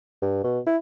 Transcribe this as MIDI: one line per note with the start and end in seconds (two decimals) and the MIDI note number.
0.22 0.39 43
0.44 0.59 47
0.67 0.77 64